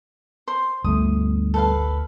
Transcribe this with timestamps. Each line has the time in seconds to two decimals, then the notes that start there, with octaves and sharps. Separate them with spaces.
0.48 C5 C6
0.84 G1 D2 A3 D#6
1.54 A4 B4 F5